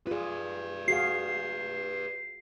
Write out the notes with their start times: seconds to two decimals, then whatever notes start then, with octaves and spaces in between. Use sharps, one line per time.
0.07 F4 G#4 B4 D5
0.88 F#4 G#4 F5 C7